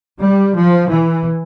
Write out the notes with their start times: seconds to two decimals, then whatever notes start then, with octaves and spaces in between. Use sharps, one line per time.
0.19 G3
0.54 F3
0.88 E3